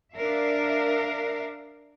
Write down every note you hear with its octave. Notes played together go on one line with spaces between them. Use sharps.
D4 A#4 E5 F5